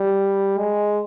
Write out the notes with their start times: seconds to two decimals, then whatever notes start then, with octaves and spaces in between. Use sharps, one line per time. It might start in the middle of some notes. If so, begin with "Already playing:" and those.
Already playing: G3
0.58 G#3